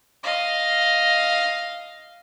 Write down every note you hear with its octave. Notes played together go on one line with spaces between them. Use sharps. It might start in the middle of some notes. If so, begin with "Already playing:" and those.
D#5 F5